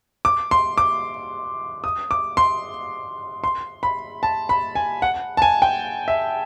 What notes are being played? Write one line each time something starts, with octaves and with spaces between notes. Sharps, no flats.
D6
C6
D6
D#6
D6
C6
C6
B5
A5
B5
G#5
F#5
A5
G#5
G5
E5